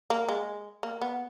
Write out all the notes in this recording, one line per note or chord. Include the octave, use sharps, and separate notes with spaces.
A#3
G#3
A#3
B3